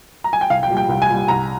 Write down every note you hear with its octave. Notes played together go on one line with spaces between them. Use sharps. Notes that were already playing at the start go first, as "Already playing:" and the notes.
A#5
G#5
G5
C2 F5
G5
A#2 G3
G5
C2
G#5
A#2 G3
C2 A#5